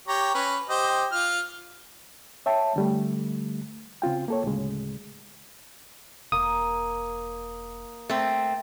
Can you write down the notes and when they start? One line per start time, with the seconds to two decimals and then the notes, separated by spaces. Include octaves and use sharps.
0.08 G4 C#5 A#5
0.35 C#4 B4
0.69 G4 C5 D#5
1.12 F4 F6
2.46 C#5 E5 G5 A5
2.76 D3 G3 A3
4.02 C#3 C4 F4 G5
4.28 A#3 A4 C#5
4.44 D2 A2 C#3 G#3
6.32 E1 A#3 D#6
8.09 A3 C4